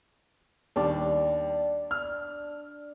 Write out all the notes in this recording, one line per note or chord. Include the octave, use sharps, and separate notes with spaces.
D#2 G3 D4 D5
F6